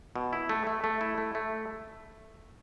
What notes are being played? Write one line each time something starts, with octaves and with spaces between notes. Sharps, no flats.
B2
E4
A3
A3
A3
E4
A3
A3